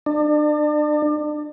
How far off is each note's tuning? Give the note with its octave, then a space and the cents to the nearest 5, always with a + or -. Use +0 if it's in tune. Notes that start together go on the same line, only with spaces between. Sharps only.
D4 +35